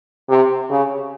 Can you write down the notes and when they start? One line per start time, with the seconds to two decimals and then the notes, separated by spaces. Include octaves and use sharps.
0.29 C3
0.70 C#3